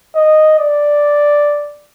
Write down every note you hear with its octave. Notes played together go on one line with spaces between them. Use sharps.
D#5
D5